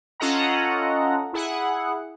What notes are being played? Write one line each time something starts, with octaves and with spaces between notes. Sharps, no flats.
C#4 F4 A4 D#5 F#5 A#5
E4 G#4 F#5